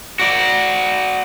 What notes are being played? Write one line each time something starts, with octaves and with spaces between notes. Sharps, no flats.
F#4 D5